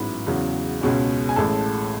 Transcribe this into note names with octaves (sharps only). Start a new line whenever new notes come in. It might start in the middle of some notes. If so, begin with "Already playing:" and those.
Already playing: A1 G#2 F#3 B3 E4 B4 B5
E2 C#3 F#3
C#2 B2 G#3 C#4
G#5
A1 A2 G#3 A4 A5